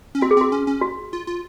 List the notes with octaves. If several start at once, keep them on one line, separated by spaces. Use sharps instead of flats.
C#4
C4 F#4
G#4
C4 F#4
C#4
C#4
F#4
F4
F4